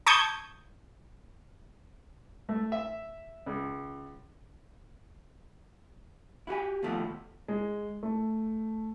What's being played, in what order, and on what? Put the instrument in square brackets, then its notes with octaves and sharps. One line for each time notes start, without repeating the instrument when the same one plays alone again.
[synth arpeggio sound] A5 C#6 D#6 G6 G#6
[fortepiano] A3
E5
C#2
[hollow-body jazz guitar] E4 F#4 G4 G#5
D#2 G#2 B2 F3 A3 B3
[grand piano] G#3
A3